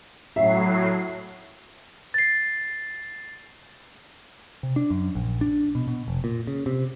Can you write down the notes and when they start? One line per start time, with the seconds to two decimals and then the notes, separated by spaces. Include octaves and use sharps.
0.36 A2 F#3 E5 C7
2.14 A6 C7
4.63 C3
4.76 D4
4.90 F#2
5.15 A#1
5.41 D4
5.75 B2
5.88 B2
6.08 F1
6.24 A#2
6.47 C#3
6.66 C3